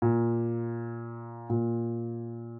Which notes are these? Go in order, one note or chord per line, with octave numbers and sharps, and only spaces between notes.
A#2
A#2